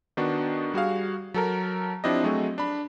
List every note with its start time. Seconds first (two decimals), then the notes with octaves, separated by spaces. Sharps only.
0.17 D#3 B3 D4 F#4
0.74 G3 F#4 G#4 F5
1.34 F#3 A4 A#4
2.04 F3 C4 D4 E4 G4 D#5
2.24 F#3 A3 C4 F#4 G#4 D#5
2.58 D4 B5